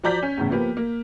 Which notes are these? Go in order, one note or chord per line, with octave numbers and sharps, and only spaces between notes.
F3 F#4 D5 A#5 G6 B6
C#4
E2 A2 C#3
F3 A#3 B3 G4
A#3